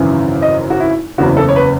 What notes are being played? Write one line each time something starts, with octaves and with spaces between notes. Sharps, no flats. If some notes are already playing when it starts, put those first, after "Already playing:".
Already playing: G#1 F#2 C#3 E3
D#5
F#4
E4
F#1 E2 C#3 F#4
A4
C#5
B4